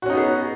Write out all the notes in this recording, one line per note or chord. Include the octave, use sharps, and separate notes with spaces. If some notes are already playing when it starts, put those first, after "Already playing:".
B3 C#4 D#4 F#4 G#4